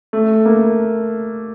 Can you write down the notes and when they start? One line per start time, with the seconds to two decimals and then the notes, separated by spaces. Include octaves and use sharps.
0.13 A3
0.45 A#3